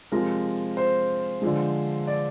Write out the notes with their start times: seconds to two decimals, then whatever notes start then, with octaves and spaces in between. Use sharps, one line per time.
0.12 C3 F3 G#3 A#4
0.77 C5
1.42 D3 F3 G#3
2.07 D5